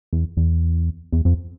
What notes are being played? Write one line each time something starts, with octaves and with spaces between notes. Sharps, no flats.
E2
E2
E2
F2